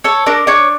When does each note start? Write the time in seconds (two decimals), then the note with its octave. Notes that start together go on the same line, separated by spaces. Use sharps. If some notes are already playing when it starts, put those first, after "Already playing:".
0.04 A4 C#5
0.26 D4 A#4
0.47 D4 C#5